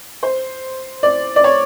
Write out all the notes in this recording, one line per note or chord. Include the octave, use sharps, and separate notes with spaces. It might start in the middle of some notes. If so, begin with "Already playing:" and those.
C5
D5
D5
C#5